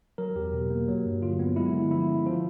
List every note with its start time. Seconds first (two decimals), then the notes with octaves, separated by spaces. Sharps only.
0.18 F#3 A#4
0.36 E2 G4
0.53 B2
0.70 A#3
0.88 F#3
1.05 G2
1.22 D3 F4
1.39 B3
1.56 G#3 E4
1.74 D3
1.91 F3 E4
2.09 C#4
2.26 F3 F4